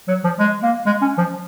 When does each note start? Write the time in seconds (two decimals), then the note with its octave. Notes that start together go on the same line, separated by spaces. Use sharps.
0.08 F#3
0.24 F3
0.39 G#3
0.63 A#3
0.86 G#3
1.02 C#4
1.18 F3